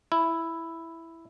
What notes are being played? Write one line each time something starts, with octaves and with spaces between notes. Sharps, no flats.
E4